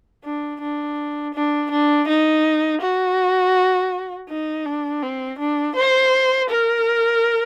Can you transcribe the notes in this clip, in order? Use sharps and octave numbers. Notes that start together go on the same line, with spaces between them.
D4
D4
D4
D4
D#4
F#4
D#4
D4
C4
D4
C5
A#4